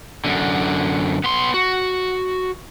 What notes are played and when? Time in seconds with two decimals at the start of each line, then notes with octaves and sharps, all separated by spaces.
0.25 F#2 D3
1.24 B3 C6
1.54 F#4